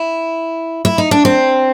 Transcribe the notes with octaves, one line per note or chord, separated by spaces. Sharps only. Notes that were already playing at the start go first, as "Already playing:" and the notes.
Already playing: E4
E4
D#4
D4
C4